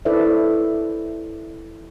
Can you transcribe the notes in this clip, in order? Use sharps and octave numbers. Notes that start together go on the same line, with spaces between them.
E4 A4 B4 C5 D5 E5